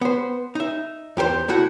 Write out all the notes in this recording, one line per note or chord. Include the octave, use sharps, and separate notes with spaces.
B3 C5
D#4 E5
E2 G4 A#4 C5 C6
C2 A3 E4 F#4 F#5